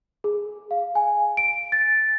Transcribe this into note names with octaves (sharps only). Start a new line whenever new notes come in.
G#4
F5
G#5
D7
A6